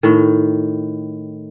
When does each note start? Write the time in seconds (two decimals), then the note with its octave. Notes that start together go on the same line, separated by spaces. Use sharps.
0.03 A2 D#3